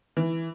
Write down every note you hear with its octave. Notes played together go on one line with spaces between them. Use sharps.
E3